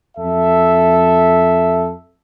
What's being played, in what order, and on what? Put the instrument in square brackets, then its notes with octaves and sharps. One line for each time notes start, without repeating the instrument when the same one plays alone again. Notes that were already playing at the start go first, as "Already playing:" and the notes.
[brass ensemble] F2 A4 E5